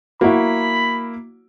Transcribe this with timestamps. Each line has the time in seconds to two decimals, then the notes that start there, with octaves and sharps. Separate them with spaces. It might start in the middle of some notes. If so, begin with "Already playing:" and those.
0.21 A#3 E4 F#4 B5